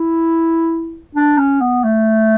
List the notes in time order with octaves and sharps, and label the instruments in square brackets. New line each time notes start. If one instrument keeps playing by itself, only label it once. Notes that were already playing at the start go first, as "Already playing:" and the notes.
Already playing: [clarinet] E4
D4
C#4
B3
A3